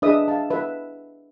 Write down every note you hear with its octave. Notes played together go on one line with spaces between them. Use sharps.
D4 G#4 B4 D#5 E5 D#6
E5 F5 A5
B4 E5